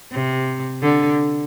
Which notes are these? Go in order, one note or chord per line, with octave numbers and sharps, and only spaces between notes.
C3
D3